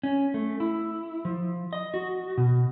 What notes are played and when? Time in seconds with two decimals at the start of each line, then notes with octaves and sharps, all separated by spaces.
0.03 C#4
0.34 A3
0.60 E4
1.25 F3
1.73 D#5
1.94 F#4
2.38 B2